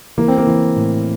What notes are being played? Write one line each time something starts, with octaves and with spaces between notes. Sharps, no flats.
E3 A#3
C4
A#3
E3
A2